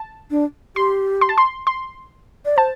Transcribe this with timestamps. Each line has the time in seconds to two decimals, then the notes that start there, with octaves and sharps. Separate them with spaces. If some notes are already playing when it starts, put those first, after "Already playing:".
Already playing: A5
0.31 D4
0.76 G4 C6
1.21 C6
1.29 A5
1.38 C6
1.67 C6
2.45 D5
2.57 C5 A5